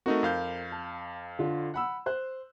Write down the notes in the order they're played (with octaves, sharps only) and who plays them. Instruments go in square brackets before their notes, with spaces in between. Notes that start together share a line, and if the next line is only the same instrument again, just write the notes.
[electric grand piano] A3 D#4 F#4 [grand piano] C4 A#4
[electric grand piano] F2 F5 G6
[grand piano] A5
D3 F4
F#5 B5 E6
C5 F#6